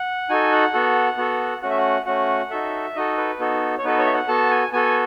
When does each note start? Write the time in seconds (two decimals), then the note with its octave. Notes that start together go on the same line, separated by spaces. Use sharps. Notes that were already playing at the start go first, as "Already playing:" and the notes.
Already playing: F#5
0.29 D#4 F#4 A4 G#5
0.52 F#5
0.73 B3 F#4 A4
1.18 B3 F#4 A4
1.62 A3 C#4 F#4 F#5
1.70 E5
1.78 F#5
2.06 A3 C#4 F#4 F#5
2.50 D#4 F#4 A4 E5
2.95 D#4 F#4 A4 D#5
3.17 B4
3.40 B3 D#4 F#4 A4
3.78 C#5
3.84 B3 D#4 F#4 A4 B4
3.99 C#5
4.06 E5
4.14 F#5
4.28 B3 F#4 A4 A5
4.51 G#5
4.73 B3 F#4 A4 G#5